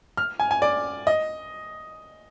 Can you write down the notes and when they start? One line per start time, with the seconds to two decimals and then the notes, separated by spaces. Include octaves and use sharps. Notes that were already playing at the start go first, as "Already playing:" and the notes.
0.17 F6
0.40 G#5
0.51 G#5
0.62 D5
1.07 D#5